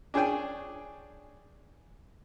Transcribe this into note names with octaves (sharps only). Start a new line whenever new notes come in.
D4 G#4 C#5 G5 G#5